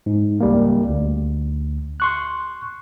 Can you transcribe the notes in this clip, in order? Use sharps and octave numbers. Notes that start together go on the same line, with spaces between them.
G#2
C#2 G3 A#3
D2
C6 C#6 F#6